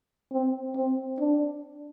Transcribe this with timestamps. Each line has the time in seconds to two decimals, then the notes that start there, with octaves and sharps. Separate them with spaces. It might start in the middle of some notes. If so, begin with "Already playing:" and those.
0.33 C4
0.77 C4
1.20 D4